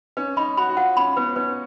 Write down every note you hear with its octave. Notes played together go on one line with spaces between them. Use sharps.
C#4 B4
D#4 B5
F#4 B5
F#4
F4 F#5
C#4 B5
B3 B4
C#4 B4